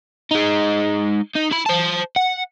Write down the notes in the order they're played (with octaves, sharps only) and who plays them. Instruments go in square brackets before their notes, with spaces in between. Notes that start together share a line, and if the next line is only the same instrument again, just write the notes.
[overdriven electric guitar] G#3 D#4
D#4
E4 B5
C5 A5
F#5